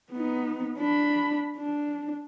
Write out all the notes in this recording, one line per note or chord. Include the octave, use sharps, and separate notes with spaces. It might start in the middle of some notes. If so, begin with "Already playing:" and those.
B3 D#4
D4 B5
D4